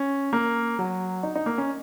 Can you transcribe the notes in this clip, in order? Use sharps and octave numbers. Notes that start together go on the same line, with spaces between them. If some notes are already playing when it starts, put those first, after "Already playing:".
Already playing: C#4
A#3
F#3
D#4
D#4
A#3
C#4